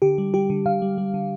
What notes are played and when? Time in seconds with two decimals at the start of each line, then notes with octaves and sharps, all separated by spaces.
0.02 D3 G4
0.18 G3
0.34 G3 G4
0.50 D3
0.66 D3 F5
0.82 G3
0.98 G3
1.14 D3